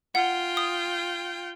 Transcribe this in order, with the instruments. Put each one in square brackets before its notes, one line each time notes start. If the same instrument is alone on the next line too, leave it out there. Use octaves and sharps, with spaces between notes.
[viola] F4 G5 [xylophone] F#5
[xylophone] D#6